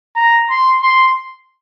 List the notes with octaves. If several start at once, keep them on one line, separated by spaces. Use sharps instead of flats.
A#5
C6
C6